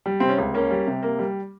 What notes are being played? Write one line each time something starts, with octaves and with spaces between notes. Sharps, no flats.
G3
C3 C4
C#4
C#2
A#3 C#4
G3
C3
A#3
G3